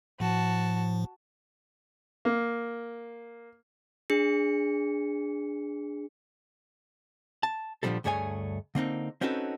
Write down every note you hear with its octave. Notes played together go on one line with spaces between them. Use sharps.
A2 F3 F#4 A5
A#3
D4 G#4 C#7
A5
A#2 D3 D#3 F3 G3 A4
D2 G2 A3 G#4 C#5 G#5
D3 A#3 C4 D#4
C4 C#4 D#4 F#4 A4 B4